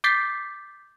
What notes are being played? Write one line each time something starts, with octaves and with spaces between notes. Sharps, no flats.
D6 G6 A6 B6 C7